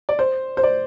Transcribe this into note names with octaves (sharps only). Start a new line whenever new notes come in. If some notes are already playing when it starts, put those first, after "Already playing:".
D5
C5
C5
D5